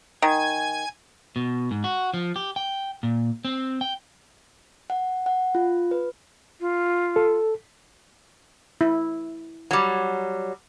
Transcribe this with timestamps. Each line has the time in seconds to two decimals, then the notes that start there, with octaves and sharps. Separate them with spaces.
0.22 D#3 G#5 G#6
1.36 B2
1.71 G#2
1.84 F#4
2.14 F3
2.36 G4
2.56 G5
3.03 A#2
3.45 C4
3.81 G5
4.90 F#5
5.26 F#5
5.55 F4
5.91 B4
6.60 F4
7.16 A4
8.81 E4
9.71 F#3 G3